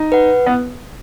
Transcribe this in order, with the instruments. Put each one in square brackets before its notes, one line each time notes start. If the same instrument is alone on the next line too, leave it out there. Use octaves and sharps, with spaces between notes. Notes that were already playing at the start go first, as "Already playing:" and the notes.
Already playing: [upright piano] D#4
[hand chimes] B4 F#5
[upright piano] B3